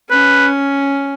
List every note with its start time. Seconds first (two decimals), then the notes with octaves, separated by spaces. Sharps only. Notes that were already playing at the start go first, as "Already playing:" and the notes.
0.11 C#4 B4